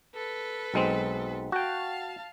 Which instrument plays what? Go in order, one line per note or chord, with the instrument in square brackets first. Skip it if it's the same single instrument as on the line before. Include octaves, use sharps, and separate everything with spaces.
[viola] A4 B4
[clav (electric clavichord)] B1 G#3 C4
[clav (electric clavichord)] F#4 G5 [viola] F5 A5